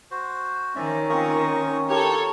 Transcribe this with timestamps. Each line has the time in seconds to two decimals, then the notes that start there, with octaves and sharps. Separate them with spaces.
0.11 F#4 C5
0.76 D#3 C#4 D5 E5
1.10 A#3 C4 D#4 F4 C#6 D#6
1.90 D#4 E4 G4 A4 A#4 C#5 A5